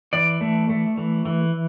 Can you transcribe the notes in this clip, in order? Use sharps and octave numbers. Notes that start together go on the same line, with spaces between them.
E3 D5
A3
A3
E3
E3